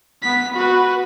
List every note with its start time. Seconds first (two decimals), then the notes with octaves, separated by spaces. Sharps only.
0.22 B3 B6
0.54 F#4 B4